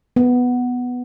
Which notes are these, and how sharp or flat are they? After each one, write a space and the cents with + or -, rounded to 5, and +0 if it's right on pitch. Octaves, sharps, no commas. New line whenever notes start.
B3 +0